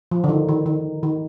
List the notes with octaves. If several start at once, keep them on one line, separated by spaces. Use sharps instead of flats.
F3
D3
D#3
D#3
D#3
D#3